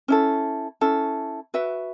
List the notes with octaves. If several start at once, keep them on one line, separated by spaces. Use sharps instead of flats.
C#4 E4 A4
C#4 E4 A4
F#4 B4 E5